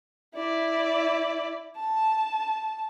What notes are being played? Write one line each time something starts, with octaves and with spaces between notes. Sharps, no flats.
E4 D5
A5